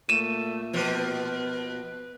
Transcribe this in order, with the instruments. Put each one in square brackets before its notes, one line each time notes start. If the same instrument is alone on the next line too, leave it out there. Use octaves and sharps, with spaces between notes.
[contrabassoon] A#2 [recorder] A3 [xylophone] D#7 E7
[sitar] B2 F3 [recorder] B4